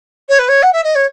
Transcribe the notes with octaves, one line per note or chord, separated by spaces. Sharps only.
C#5
B4
C#5
F#5
E5
D#5
C#5